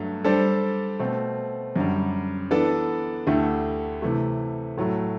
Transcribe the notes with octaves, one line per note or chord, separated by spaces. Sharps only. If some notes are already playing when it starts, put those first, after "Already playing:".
Already playing: G2 F#3 A3
G3 D4 A4 C5
B2 A3 C4
F#2 D3 G3
E3 B3 D4 A4
D2 D3 A3 E4 G4
C3 E3 A3
A2 F#3 A3